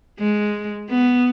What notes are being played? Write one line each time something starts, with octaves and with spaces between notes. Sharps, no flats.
G#3
B3